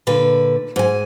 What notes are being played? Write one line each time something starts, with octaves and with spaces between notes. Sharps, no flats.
A#2 D3 B4
G#2 G#5